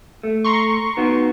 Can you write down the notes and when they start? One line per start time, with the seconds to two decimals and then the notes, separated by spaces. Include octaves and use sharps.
0.23 A3
0.45 A#5 C6 C#6
0.97 D#3 B3 F#4